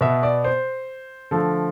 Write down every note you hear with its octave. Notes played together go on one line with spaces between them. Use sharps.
B2 B3 E5
D5
C5
D3 F3 A3 A4